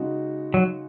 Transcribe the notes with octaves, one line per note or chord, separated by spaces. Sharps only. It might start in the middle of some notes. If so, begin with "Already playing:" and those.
Already playing: C#3 G#3 D#4 F#4
F#3